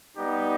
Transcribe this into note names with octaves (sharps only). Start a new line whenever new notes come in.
G3 B3 D#4 G4 D5